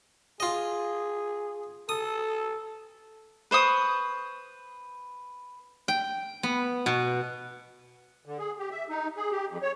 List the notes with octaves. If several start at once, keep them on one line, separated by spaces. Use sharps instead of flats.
F4 G#4 D#5
A4 D#6
B4 C5 C#6 D#6
G5
B3
B2
D3
G#4
G4
E5
D#4
G#4
G4
F2
C#5